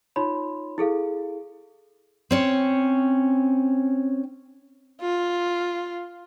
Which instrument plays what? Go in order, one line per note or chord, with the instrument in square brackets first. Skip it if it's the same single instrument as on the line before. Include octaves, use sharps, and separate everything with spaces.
[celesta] D#4 F4 C#5 B5 C6
E4 G#4 A4 F5
[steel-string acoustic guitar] C4 C#4 C#5
[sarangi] F4